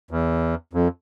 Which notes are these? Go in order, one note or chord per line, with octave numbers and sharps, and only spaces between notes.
E2
F2